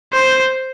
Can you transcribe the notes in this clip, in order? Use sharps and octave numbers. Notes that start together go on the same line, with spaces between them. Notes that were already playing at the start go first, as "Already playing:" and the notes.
C5